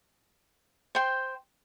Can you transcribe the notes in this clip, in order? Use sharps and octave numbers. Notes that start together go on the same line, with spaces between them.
C5 G5 C6